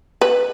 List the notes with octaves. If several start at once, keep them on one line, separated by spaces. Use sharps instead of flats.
B4